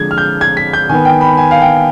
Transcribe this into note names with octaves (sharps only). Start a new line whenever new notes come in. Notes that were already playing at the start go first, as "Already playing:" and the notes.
Already playing: D3 F3 G#3 G#6
F6
G6
G#6
B6
G6
D#3 B3 G#5
G5
B5
G#5
F5
G5